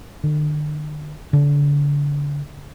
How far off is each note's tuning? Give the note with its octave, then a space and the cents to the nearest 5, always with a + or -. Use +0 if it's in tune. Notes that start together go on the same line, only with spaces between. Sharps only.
D3 +40
D3 -30